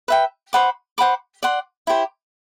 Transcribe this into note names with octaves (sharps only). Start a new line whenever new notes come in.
B4 E5 G5
C5 F#5 B5 D6
C5 F#5 B5 D6
D5 F#5 C6
E4 G4 C5